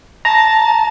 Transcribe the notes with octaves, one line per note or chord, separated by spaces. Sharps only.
A5 A#5